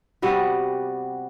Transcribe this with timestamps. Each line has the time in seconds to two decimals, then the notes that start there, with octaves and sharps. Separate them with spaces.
0.22 C3 G3 B3 F#4